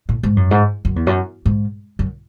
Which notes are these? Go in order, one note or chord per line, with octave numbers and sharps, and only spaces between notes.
A2
G#2
F#2
G#2
F#2
E2
F#2
G#2
F#2